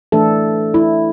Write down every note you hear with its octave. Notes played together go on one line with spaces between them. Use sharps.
E3 A3 D4 A4
E4